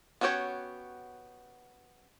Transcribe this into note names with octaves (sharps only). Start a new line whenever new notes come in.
B3 C#4 F#4 G4 C#5